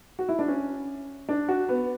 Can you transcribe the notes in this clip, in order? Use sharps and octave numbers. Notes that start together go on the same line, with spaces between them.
F#4
E4
D4
C#4
D4
F#4
B3